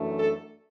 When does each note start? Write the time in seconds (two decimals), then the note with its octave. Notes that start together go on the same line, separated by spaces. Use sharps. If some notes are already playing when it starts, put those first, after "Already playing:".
Already playing: F#2 E3 A3 D4
0.19 A4